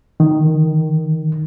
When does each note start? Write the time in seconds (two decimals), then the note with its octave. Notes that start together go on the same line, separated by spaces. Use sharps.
0.20 D#3